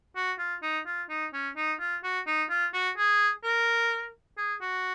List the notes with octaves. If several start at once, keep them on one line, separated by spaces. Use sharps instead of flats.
F#4
F4
D#4
F4
D#4
C#4
D#4
F4
F#4
D#4
F4
F#4
G#4
A#4
G#4
F#4